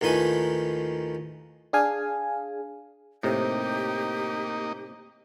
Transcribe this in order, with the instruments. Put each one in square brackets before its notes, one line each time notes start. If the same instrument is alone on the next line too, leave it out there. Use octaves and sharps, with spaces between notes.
[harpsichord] D#2 A2 F3 D#4 B4 G#5
[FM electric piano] D4 G#4 F5 G#5
[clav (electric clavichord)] A2 C3 [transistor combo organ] A#3 D#4 [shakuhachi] G4